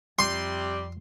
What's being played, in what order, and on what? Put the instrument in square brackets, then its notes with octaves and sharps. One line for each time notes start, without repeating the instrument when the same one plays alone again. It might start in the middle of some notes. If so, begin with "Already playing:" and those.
[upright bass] F2 [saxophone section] C3 G3 [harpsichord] C6